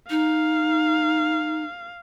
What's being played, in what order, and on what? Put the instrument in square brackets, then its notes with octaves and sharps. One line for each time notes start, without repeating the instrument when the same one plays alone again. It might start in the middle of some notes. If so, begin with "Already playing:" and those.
[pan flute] D#4 [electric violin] F5